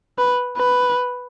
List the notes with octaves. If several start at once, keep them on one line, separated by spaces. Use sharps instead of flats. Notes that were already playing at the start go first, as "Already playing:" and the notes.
B4
B4